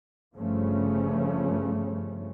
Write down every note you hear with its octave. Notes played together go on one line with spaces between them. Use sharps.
G1 G2 C#3 F3 A3 C#4